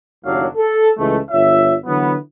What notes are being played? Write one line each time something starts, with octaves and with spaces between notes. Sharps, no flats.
F#1 D#2 A2 F#3 D4 F5
A4
C#2 E3 G#3 A3
G1 F4 C#5 E5
D3 E3 F#3 B3